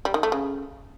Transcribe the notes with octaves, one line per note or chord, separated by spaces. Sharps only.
G3
D#3
A3
C#3